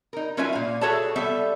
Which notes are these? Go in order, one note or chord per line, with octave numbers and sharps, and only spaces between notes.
D#4 A#4
F#3 C#4 F4 B4 E5 G#5
A#2 F5
F#4 G#4 A4 C#5 E5 A5
G3 B3 A4 E5